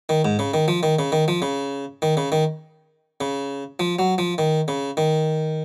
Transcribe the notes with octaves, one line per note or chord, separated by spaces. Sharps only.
D#3
G#2
C#3
D#3
F3
D#3
C#3
D#3
F3
C#3
D#3
C#3
D#3
C#3
F3
F#3
F3
D#3
C#3
D#3